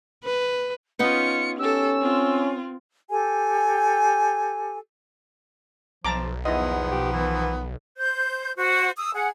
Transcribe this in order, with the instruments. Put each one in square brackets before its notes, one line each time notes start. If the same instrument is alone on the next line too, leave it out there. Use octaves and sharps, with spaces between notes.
[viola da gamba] B4
[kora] B3 D#4 B4 [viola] C#4 F4 [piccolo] C#7
[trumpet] C#4 [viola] G4 A4 [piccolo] E6
[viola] C4 F4
[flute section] G4 A4 G#5
[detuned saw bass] B1 [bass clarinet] F3 [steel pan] A5 A#5 D6
[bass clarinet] E2 [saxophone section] D#3 F3 B3 [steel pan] E4 D#5
[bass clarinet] G4
E3
[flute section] C5 G6
F#4 C5
D#6 E6
G#4 F#5